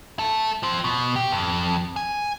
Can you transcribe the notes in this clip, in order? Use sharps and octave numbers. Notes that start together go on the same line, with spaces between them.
A3 A4
F3 C4
B2
G4
F2
G#5